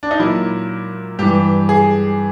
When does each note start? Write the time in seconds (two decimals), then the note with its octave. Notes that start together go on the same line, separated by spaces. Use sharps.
0.03 D4
0.11 D#4
0.20 A#2 F#3 E4
1.19 G2 E3 G4
1.69 G#4